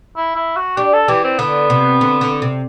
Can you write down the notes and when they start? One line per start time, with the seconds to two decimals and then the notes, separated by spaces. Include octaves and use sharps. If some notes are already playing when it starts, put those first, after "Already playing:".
0.16 E4
0.36 E4
0.56 F#4
0.77 D4 G4
0.93 A4
1.08 E3 G4
1.24 C4
1.39 D3 B3
1.70 C3
2.01 D3
2.21 D3
2.42 C3